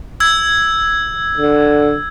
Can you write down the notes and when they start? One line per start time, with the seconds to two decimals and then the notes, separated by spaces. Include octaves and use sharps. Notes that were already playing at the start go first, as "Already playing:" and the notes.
0.20 E6 G#6
1.38 D3